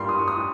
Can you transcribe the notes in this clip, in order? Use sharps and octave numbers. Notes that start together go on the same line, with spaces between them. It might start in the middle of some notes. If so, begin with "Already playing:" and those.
Already playing: G2 G3 A#3 C6
D#6
C#6
D#6